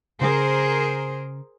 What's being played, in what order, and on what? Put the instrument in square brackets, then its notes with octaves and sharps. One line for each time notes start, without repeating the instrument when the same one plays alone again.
[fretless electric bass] C#3 [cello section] G#4 A#4 C5